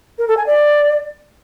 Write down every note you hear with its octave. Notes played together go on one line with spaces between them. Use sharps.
A#4
A4
G#5
D5